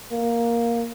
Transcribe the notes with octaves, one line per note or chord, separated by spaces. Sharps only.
A#3